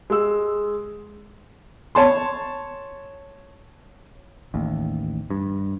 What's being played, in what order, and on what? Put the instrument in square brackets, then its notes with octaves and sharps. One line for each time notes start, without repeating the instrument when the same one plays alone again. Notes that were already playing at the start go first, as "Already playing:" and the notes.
[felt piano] G#3 E6
[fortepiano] C#5 A5 C6
[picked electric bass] A1 D#2
G2